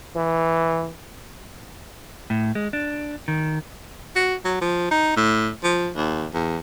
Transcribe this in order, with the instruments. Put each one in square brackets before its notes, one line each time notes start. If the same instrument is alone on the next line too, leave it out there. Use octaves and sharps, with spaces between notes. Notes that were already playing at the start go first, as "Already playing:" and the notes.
[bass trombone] E3
[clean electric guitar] A2
G#3
D4
D#3
[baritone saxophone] F#4
F#3
F3
D#4
A2
F3
D#2
E2